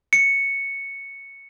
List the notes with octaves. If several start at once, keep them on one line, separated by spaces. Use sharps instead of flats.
C#7